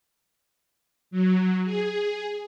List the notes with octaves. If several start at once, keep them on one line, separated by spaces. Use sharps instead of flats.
F#3
G#4